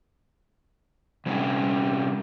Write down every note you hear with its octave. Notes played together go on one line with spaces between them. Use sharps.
C3 G3 C#4